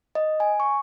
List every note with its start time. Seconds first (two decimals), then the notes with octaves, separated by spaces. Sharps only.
0.15 D#5
0.40 G#5
0.60 C#6